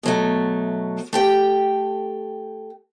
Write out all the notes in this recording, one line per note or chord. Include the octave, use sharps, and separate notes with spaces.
B2 F#3 A3
A3 G4 G5